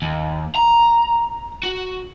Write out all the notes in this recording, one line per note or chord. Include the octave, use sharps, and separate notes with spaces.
D#2
A#5
F#4